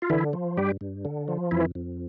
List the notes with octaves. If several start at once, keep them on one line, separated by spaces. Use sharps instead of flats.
F4
D3 E3 E4
F3
G2 G3 G4
G2
D3
F3
F2 E3 E4
F2